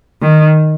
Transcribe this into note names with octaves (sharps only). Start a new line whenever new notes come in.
D#3